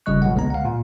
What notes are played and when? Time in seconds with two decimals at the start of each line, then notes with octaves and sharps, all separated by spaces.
0.06 G1 C#3 G3 D#5 C#6 F#6
0.22 G1 B2 F#3 G#3 F#5
0.35 C#2 D3 G#3 B3 A#5
0.50 F5 F#5
0.65 A#2